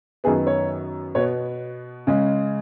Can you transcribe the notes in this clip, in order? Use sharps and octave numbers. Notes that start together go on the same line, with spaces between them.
F#2 D#3 B3 G#4
C#5
B2 B3 C#5
C#3 G#3 C#4